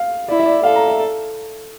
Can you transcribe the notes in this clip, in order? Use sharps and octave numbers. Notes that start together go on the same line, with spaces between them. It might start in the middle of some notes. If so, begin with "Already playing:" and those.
Already playing: F5
E4 D5
E5
D5
A4 F5
A#5
E5